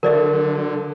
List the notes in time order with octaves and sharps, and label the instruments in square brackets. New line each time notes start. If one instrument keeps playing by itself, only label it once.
[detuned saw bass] D3 [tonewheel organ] F#3 A4 [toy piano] A#4 D5 E5